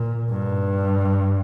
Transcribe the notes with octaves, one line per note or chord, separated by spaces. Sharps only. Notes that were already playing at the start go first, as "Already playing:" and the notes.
Already playing: A#2
G2